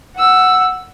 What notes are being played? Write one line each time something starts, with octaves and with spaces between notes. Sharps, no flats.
F#5 E6